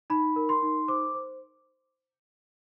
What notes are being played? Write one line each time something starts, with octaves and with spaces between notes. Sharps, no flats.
D#4 B5
A#4
C6
D#4
C5 D6
C5